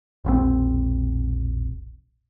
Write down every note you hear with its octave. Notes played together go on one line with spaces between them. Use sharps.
E1 A#1 B2 C4